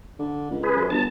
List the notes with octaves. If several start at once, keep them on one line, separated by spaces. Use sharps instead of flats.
D3
C#2
G#4 B4
F#2
G1 A5